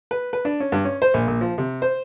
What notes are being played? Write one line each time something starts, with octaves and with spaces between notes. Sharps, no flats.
B4
B4
D4
C#4
G2
C#4
C5
A#1
A#1
F3
C3
C5